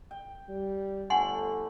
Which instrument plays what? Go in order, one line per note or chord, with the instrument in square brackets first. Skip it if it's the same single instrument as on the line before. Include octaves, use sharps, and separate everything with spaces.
[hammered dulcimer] G5
[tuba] G3
[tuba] G1 [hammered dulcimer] D3 A3 [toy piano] F#5 G#5 C6